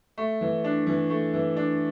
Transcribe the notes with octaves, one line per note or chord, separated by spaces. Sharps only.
A3
E3
D4
E3
A3
E3
D4